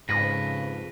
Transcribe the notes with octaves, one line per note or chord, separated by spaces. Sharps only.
F2 G#2 C#3 B4 A#6